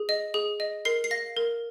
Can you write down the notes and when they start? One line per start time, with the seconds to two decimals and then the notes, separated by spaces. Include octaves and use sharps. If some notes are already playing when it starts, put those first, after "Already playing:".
Already playing: G#4
0.09 D#5
0.34 G#4
0.60 D#5
0.85 A#4 C7
1.04 C7
1.11 F5 A#6
1.37 A#4